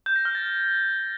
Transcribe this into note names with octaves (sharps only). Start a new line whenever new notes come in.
G6
A#6
F6
A6